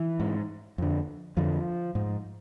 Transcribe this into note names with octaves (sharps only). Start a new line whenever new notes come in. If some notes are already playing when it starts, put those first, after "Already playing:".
Already playing: E3
G#2
F2 D3
F2 D3 F3
G#2